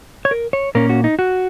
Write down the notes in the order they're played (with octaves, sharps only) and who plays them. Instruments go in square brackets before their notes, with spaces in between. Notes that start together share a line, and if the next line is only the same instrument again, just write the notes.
[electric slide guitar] C#5
A#4
C#5
A#2 A#3 C#4 A#4
F#4
D#4
F#4